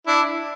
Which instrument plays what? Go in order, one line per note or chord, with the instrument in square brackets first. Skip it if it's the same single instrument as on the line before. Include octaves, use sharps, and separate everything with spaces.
[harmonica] D4 E4